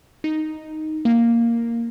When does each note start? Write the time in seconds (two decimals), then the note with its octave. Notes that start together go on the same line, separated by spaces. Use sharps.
0.24 D#4
1.05 A#3